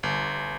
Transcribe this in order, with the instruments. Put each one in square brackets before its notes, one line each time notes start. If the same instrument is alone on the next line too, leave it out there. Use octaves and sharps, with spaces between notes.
[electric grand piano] G1